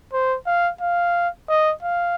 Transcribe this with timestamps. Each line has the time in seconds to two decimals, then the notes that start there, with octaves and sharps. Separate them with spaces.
0.13 C5
0.47 F5
0.81 F5
1.49 D#5
1.83 F5